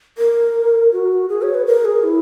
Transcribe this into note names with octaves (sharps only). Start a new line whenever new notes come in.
A#4
F#4
G#4
C#5
B4
A#4
G#4
E4